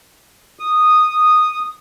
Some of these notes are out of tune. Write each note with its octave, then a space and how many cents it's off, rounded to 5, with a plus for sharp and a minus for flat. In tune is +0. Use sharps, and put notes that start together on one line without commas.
D#6 -10